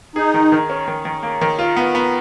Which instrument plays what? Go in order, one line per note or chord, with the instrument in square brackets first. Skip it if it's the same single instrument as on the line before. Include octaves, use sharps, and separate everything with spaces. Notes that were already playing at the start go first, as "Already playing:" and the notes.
[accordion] D#4 [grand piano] G#4
[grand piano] D#3
D#3
C#4
D#3
D#3
A#3
D#3
F4
B3
B3